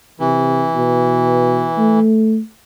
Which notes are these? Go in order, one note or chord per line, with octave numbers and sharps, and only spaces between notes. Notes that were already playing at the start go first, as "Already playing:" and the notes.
C3 E3
B2
A3